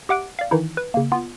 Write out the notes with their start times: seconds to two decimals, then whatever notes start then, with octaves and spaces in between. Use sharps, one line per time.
0.09 G4 E5 F#5 D6 F#6 D7
0.39 D5 F5
0.51 D#3 E3 D#4 E4
0.77 B4
0.94 C#3 A#3
1.12 B3 F4